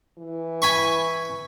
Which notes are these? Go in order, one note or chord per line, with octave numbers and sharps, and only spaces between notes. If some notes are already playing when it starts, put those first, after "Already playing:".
E3
G#5 B5 C#6